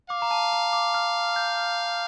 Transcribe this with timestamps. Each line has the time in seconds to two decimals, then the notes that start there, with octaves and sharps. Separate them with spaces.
0.10 F5 D6
0.22 A#5
0.31 A5
0.53 A#5
0.73 D6
0.94 F6
1.36 G6